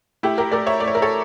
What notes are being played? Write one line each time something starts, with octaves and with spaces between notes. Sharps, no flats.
A3 E4 G4
G4 A#4
A3 A#4 D5
C#5 E5
A3 D5
C#5
A#4
A4 C#5